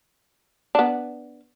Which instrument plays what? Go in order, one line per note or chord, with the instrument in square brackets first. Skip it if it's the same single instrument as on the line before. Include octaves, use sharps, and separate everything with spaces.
[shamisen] B3 D4